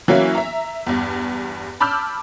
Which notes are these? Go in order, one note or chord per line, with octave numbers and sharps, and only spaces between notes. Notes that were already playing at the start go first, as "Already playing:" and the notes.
E3 F#3 A#3 C#4 E4
E5 A#5
E2 G2
A5 B5 D6 E6 F6 G6